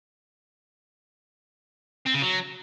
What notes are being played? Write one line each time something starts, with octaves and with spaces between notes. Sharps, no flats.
C4
C#3
F#3